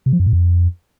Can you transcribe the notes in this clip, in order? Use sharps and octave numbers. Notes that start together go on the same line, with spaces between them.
C3
F3
F#2
A2
F2